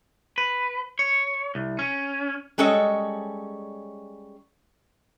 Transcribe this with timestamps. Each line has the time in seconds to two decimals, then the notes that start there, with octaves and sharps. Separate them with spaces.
0.38 B4
0.99 C#5
1.55 C2
1.79 C#4
2.58 G3 G#3 C#4 A4 C#5 D#5